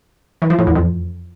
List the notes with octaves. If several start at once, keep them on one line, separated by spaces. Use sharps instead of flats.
E3
F3
A2
E2
F2